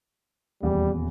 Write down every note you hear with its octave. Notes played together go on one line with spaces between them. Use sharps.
D#1 E2 G3